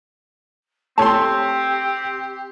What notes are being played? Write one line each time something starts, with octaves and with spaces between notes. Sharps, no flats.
A3 C4 G4 C#5 A5 C6